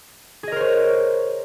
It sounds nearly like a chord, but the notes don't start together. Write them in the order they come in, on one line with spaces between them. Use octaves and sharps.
G#4 D#5 A#4 C5 C#5